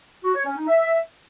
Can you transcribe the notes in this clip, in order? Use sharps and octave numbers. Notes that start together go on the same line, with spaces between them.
F#4
C#5
C#4
D#4
E5